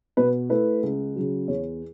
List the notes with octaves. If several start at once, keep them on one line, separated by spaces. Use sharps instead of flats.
B2 B4
A3 E4 B4
C#2
C#3 F#3
E2 C#5